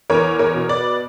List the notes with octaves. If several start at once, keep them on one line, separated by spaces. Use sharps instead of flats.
E2 A#4 C#5
A#4 C#5
B2
B4 D5